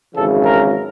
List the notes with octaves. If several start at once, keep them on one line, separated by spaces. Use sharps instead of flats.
G#1 F#2 C#3 E3 A4
A#4